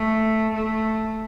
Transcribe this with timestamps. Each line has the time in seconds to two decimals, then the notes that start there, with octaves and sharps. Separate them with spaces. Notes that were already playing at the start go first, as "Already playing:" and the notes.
Already playing: A3
0.54 A3